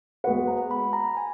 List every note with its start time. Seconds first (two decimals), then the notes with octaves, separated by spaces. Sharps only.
0.24 G#3 B3 F#4 B4 F#5
0.48 A#5
0.71 B5
0.93 A#5
1.17 G#5